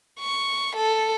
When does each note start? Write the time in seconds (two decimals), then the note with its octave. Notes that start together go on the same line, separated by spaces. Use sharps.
0.20 C#6
0.76 A4